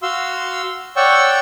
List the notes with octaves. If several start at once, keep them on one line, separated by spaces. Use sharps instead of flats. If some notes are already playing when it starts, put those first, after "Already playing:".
F#4 F5 C6 E6
C#5 D5 F#5 G5 C#6 E6